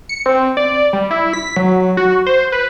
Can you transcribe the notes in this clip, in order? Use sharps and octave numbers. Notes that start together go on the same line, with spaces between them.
C#7
C4
D5
G3
E4
B6
F#3
F#4
C5
B4